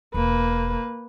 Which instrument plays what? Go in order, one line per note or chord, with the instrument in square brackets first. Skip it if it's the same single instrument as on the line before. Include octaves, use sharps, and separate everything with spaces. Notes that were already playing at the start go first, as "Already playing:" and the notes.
[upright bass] E1 [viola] A#3 B4